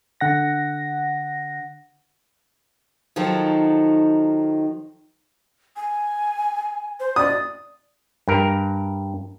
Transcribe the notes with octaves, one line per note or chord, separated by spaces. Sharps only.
D3 F#5 A#6
D#3 F3 F#3 D#4 A4
G#5
C5
D5 D#6
G2 A#4